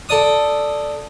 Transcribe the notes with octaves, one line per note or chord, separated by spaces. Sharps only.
A4 D5 D#6